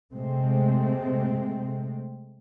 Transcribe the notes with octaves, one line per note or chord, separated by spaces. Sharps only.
C3 G#3 A3 C4